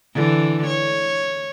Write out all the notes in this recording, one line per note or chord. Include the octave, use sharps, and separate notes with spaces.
D3 E3
C#5